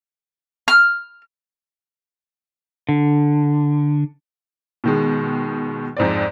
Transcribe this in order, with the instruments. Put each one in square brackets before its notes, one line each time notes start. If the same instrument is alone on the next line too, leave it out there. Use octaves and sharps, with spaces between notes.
[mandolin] F6
[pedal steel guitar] D3
[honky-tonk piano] B2 D#3 G#3
F2 G#2 C4 D5